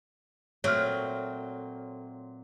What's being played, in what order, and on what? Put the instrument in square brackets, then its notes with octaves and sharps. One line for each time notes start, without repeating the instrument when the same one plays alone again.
[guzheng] A#2 F#3 C4 [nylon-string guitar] A3 [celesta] C#5 F6